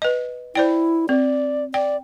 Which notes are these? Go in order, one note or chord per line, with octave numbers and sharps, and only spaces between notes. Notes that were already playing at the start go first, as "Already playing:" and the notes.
B4 D#5
E4 C5 D5 G5
C4 D5
D5 G5